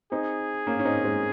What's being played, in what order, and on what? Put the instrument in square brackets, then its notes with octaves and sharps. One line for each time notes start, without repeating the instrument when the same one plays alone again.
[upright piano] C4 D#4 [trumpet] G#4
[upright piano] A#3 C#4
C#4
C4 D#4
G#3 C4